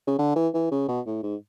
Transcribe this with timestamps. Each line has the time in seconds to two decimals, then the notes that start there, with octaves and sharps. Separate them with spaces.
0.07 C#3
0.19 D3
0.36 E3
0.54 E3
0.71 C#3
0.88 B2
1.06 A2
1.23 G#2